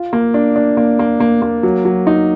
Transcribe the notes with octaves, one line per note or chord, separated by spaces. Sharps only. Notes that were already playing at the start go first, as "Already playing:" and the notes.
Already playing: F4
A#3
D4
D4
A#3
A#3
A#3
A#3
F#3
F#3
D#4